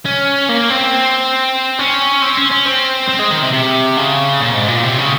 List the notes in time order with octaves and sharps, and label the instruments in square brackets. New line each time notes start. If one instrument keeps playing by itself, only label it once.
[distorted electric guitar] C#4
A#3
C4
C#4
C4
C#4
C#4
C4
C4
G#3
D#3
C3
C3
C#3
A#2
G#2
A#2
C3
C#3